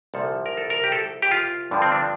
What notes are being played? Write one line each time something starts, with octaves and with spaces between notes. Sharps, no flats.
C2 A#2 F3 A4
A#4
A4
A#4
G4
A4
G4
F4
G2 D3 F3
C4
D4